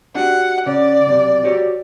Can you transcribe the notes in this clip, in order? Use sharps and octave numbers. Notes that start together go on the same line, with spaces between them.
D4 F#4 G4 F#5
C#3 C#4 D5
B1 C3
F#4 G4 C#5